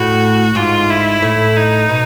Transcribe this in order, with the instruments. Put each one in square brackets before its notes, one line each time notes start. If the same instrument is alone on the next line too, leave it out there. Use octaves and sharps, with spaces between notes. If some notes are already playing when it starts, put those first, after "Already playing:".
Already playing: [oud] A2 [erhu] F#4
[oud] G#2 [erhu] F4
[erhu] E4
[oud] A2
[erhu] D#4
[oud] B2